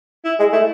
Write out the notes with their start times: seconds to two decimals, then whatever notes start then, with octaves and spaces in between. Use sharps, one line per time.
0.25 E4
0.40 G#3
0.53 A3 E4